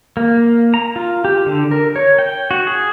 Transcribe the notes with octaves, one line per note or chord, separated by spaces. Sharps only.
A#3
A#5
F4
G4
D3
A#4
C#5
G5
F#4
G#4